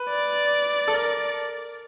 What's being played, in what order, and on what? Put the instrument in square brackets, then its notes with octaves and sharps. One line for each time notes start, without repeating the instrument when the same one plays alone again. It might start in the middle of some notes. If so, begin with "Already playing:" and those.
Already playing: [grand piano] B4
[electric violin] D5
[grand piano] A4
A#4